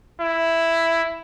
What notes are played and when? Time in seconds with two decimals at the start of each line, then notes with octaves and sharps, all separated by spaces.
0.20 E4